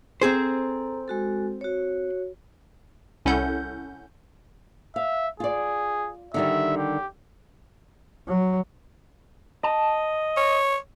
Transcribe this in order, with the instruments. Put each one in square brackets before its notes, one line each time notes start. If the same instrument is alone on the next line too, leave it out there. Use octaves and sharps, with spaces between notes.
[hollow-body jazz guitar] C4 G#4 C5 [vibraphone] A4 A#5
[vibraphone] G#3 F#4 A4
F#4 C#5
[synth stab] C2 C#4 E4 A4 F#5 G6
[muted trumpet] E5 [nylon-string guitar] F5
[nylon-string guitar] F4 D5 [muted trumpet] G#4
[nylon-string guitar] D3 D#3 G3 [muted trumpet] E5
[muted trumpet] G4
[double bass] F#3
[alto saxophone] D#5 [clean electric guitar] A5
[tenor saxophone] C#5